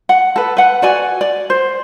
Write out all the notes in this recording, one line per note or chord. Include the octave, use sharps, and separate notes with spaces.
F#5
A4 B4
B4 F#5
F#4 D5 G#5
D5
C5